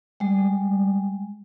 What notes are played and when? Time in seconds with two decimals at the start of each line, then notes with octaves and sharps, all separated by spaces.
0.20 G3 G#3